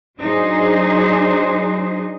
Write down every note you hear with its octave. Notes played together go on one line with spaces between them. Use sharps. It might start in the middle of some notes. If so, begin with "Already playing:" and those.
F#3 D4 D#4 G#4 C5